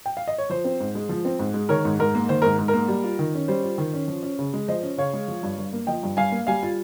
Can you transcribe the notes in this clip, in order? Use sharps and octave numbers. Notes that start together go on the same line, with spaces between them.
G5
F5
D#5
C#5
F3 C5
C4
G#2
G#3
F3
C4
G#2
G#3
D#3 A#4 C#5
G#2
G#2 A#4
A#3
D#3 C5
G#2 A#4
G#2
A#4
A#3
G3
F4
D#3
C#4
G3 C5
F4
D#3
C#4
F3
C#4
C#3
G#3
F3 C5 D#5
C#4
C#3 C#5 F5
G#3
F3
G2
G2
A#3
F3 D#5 G5
G2
G2 F5 G#5
A#3
G3 F5 G#5
F4